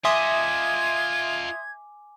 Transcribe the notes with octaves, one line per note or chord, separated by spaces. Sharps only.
F4 D#5 E5 G#5 C6 D6 D#6 G#6